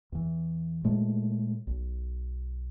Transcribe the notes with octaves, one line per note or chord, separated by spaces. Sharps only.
E2 E3
A#2 G#3 A3
B1